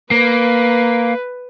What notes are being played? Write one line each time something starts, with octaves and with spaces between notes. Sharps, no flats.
A#3 B4